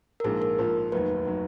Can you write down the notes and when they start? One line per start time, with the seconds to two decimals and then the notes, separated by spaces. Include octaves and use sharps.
0.20 A#4
0.24 A#1 G#2 F3 A#3 F4 G#4
0.42 A#4
0.58 A#1 G#2 F3 A#3 F4
0.92 F1 D#2 D#3 F#3 B4
1.27 D#3 F#3